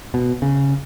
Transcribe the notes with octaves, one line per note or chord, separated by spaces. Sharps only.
B2
C#3